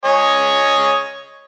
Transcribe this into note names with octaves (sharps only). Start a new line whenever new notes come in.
C#5 D#5 G#5